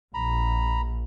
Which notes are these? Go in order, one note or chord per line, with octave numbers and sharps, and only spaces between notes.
A#1 A#5 B5